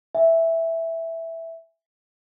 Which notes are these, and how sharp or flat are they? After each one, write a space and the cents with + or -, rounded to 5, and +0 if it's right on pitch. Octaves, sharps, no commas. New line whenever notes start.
E5 +0 G#5 -25